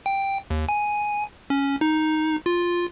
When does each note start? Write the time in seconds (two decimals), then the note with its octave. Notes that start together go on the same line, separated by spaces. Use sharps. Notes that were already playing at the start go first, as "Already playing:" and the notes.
0.06 G5
0.50 D#2
0.69 G#5
1.50 C#4
1.81 D#4
2.46 F4